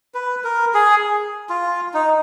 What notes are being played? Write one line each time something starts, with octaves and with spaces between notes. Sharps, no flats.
B4
A#4
G#4
F4
D#4